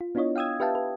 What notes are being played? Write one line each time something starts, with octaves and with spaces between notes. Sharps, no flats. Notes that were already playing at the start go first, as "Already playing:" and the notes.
F4
B3 D4 E4 F4 C#5 D#5
F5 G5 D#6 E6 G#6
G4 B4 E5 F5 G5 A5
B4